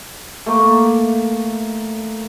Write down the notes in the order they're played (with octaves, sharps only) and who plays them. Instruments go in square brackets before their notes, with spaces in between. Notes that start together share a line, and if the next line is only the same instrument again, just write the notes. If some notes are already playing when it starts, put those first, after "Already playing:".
[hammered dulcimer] A3 A#3